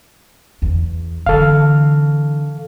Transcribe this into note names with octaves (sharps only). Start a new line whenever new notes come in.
E2
D3 E3 A4 F5